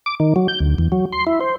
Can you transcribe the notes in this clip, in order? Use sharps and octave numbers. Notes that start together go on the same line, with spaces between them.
D6
D#3
F#3
G6
D2
E2
F#3
C6
E4
C5